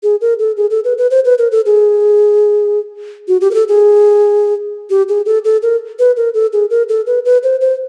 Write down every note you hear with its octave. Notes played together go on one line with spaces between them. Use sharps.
G#4
A#4
A4
G#4
A4
B4
B4
C5
B4
A#4
A4
G#4
F#4
G4
A#4
A4
G#4
G4
G#4
A4
A4
A#4
B4
A#4
A4
G#4
A#4
A4
B4
B4
C5
C5